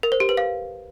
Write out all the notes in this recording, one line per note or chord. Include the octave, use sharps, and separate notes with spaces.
A#4
C5
G4
B4
F5